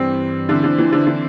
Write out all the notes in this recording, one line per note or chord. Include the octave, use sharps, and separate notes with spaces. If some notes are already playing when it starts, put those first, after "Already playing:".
Already playing: G2 E3 G3 C4
D3 E3 C4 E4 C5
D3
E3
D3
D3